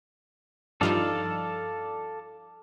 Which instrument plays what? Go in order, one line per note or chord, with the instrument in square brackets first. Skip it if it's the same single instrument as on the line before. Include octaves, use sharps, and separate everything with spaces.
[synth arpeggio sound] G2 F3 D#4 [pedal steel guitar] A4 D5 F5